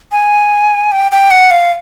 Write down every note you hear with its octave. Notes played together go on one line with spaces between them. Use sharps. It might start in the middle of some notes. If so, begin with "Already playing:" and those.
G#5
G5
G5
F#5
F5